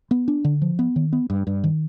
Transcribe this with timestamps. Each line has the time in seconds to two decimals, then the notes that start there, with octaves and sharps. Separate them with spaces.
0.11 B3
0.28 D4
0.44 D3
0.62 F3
0.79 B3
0.96 D#3
1.13 B3
1.30 G2
1.47 G2
1.64 D#3